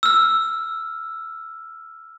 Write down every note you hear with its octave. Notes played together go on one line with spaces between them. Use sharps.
E6 F6